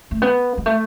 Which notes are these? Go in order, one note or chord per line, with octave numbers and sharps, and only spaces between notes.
A3
B3
G#3
A3